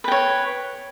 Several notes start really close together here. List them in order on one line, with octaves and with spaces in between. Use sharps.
B4 G5 C#5